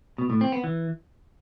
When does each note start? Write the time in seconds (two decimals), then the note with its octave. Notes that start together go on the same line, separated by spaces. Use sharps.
0.18 B2
0.30 A2
0.41 C4
0.52 B3
0.64 E3